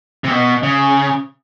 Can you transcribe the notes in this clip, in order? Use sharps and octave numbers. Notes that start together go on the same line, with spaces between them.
C3
B2
C#3